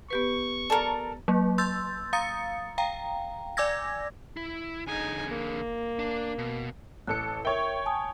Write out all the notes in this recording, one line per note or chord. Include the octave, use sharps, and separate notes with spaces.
B3 G4 B4 C#6
A4 A#4 D5 A5 A#5
F#3 A#3
C6 E6 G6 A6
F5 A#5 D#6 A6 C#7
F5 G5 A#5
D5 G#5 D6 E6 G#6 A#6
E4
D3 D#4 G#4 G#5
A#3
D4
B2
A1 A4 F#6 C#7
A#4 C#5 E5 G5
G#5 A5 D#6